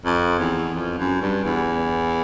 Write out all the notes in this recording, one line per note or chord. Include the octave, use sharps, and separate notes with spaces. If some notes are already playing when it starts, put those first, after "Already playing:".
F2
E2
F2
F#2
G2
E2